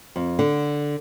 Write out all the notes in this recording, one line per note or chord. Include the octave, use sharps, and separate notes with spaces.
F2
D3